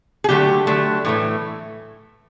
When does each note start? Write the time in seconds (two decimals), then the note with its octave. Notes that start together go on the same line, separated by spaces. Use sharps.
0.24 G#4
0.29 D3 F#3 A3 G4
0.67 D3 F#3 A3
1.05 A2 E3 A3